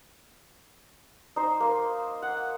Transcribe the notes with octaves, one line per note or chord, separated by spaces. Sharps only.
D#4 C5
A#3 C5
F#5